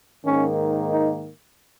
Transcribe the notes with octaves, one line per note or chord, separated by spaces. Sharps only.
G#2 D#3 A#3 C#4
D#4